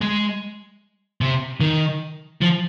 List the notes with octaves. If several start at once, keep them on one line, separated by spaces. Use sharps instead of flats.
G#3
C3
D#3
F3